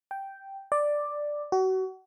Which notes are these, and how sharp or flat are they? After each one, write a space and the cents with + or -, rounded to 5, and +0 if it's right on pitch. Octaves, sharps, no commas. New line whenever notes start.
G5 -5
D5 +5
F#4 +30